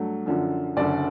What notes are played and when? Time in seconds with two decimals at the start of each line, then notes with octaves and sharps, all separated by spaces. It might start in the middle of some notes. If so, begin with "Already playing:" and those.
Already playing: G2 F#3 A3
0.26 F#2 D3 F3
0.77 F#1 F#2 D3 D5